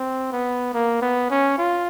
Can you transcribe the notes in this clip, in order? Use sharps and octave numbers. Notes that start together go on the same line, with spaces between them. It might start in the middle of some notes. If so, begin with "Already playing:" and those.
Already playing: C4
B3
A#3
B3
C#4
F4